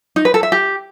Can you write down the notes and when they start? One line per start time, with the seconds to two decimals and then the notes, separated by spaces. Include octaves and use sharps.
0.16 D#4
0.25 B4
0.34 A4
0.43 E5
0.52 G4